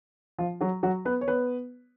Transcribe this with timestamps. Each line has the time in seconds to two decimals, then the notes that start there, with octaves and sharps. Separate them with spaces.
0.38 F3 F4
0.61 F#3 F#4
0.83 F#3 F#4
1.05 B3 B4
1.21 C#5
1.28 B3 B4